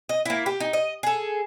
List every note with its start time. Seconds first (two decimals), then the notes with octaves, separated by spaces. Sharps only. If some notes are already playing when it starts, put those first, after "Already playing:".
0.09 D#5
0.25 A#3 E4
0.46 G4
0.60 D#4
0.73 D#5
1.03 G#4 A4